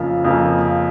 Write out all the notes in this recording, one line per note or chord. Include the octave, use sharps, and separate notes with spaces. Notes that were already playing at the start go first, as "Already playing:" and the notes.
Already playing: F2 C#3 F3 A#3
F2 C#3 F3 A#3